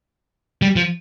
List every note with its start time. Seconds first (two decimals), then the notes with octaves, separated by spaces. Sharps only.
0.62 G3
0.76 F3